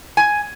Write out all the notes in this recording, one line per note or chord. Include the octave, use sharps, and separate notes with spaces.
G#5